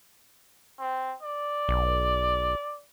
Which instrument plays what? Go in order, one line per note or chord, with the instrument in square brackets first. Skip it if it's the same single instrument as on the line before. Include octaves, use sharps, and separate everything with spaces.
[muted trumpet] C4
D5
[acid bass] B1